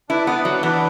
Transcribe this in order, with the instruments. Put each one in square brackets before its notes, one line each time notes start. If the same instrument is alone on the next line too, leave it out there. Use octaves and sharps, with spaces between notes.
[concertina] D4 B4 D5 [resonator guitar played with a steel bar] E4
[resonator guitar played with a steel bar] B3
F#3
[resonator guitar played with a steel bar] E3 [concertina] D4 B4 D5 F#5